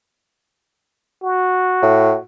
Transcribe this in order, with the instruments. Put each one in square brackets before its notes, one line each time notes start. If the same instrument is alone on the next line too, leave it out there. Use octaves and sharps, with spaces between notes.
[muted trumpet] F#4
[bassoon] A2